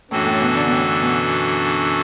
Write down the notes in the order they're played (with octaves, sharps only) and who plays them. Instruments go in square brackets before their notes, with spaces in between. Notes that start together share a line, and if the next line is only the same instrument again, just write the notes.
[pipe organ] F#2 E3 D4 F#4 A4 [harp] A2
[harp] A2
B2
D3
B2
A2
B2